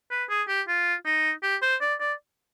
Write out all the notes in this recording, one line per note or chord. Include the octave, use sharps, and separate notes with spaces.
B4
G#4
G4
F4
D#4
G4
C5
D5
D5